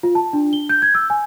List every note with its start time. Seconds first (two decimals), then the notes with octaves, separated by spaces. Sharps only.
0.03 F4
0.15 A5
0.33 D4
0.53 G7
0.69 G6
0.82 G#6
0.95 E6
1.10 G#5